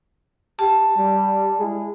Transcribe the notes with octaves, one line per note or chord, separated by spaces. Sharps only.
G4 A5
G3
G#3 E4 G#4